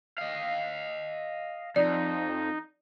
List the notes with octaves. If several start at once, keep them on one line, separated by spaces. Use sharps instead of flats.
D#5 F5
F2 D#4 D5